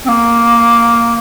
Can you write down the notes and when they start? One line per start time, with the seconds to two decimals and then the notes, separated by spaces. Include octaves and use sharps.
0.04 C4
0.08 A#3